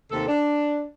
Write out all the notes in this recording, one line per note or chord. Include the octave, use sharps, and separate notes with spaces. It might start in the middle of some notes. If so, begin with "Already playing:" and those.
D#2 C3 A4
D4